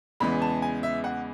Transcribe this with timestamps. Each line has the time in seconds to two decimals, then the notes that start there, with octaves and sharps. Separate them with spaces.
0.20 E2 C#3 E3 G#3 B3 B5
0.42 A5
0.62 G#5
0.83 E5
1.04 F#5